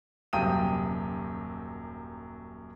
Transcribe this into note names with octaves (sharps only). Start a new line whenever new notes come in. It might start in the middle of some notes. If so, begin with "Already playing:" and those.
D#1 F#2 C3 G5 D#6 D#7